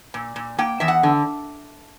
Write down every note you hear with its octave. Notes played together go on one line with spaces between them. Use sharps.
A#2
A#2
A#3 G5
E2 E5
F#5
D3